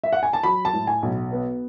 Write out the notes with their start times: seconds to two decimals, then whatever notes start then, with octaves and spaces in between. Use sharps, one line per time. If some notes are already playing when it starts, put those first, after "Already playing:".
0.04 E5
0.13 F#5
0.23 G#5
0.33 A5
0.43 F#3 B5
0.65 A5
0.73 A2
0.87 G#5
1.03 B1
1.32 B3